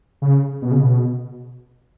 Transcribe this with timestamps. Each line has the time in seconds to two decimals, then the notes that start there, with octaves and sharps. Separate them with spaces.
0.22 C#3
0.62 B2
0.71 C#3
0.80 B2